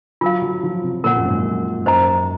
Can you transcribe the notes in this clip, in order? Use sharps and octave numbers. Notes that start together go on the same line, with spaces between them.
F#3 F4 A#4 F5
F#3
F3
C3
A#2 A#4 C#5 F#5
F#2
G#2
F#2
F#2 C5 D#5 A#5